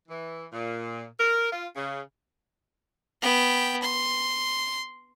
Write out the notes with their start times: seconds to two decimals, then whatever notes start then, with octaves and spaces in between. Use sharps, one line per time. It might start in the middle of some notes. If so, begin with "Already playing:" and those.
0.09 E3
0.52 A#2
1.19 A#4
1.52 F4
1.75 C#3
3.22 B3 G5
3.82 C6